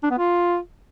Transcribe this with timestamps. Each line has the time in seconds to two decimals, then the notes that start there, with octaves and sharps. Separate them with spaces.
0.03 D4
0.11 B3
0.18 F4